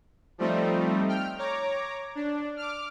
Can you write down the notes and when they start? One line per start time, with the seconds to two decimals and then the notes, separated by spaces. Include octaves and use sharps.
0.38 F3 G3 A3 C4 D#4
1.08 G5 F6
1.38 C#5 A#5 D6
2.15 D4
2.57 D6 F6